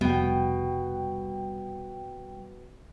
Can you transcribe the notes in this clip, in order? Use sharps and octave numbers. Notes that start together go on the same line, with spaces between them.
F1 B2 G3 B3 G5